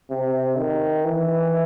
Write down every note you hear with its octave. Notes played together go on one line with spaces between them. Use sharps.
C3
D#3
E3